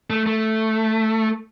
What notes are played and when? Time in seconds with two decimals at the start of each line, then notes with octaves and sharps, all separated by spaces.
0.10 A3
0.26 A3